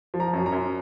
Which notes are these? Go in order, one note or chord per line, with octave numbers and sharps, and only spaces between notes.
F3
A#5
F#2
A#5
F#2